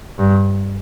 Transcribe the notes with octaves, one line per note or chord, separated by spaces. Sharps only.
G2